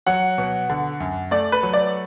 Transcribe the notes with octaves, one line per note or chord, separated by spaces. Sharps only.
F#3 F#5
B2
D3
F#2
A3 D5
B4
F#3
D5